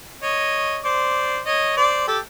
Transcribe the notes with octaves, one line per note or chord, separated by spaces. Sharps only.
C#5 D#5
C5 D5
C#5 D#5
C5 D5
G4 A4